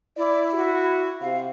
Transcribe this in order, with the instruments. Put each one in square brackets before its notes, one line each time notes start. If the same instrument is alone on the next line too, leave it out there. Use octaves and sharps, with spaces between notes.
[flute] E4 [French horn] D5
[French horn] F#4
[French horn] C3 [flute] F5